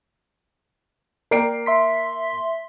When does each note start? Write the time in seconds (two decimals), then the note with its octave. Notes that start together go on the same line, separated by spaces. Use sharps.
1.31 A#3 A#4 D5 G5 C7 D7
1.66 E5 C6 B6